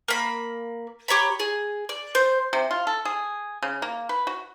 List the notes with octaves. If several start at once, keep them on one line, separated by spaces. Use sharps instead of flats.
A#3 B5
G4 C#5 A#5 B5
G#4
D5
C5
C3
F4
A4
G#4
C#3
A#3
B4
F#4